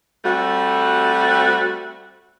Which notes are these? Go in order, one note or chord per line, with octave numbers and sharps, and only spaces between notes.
G3 A3 C4 F#4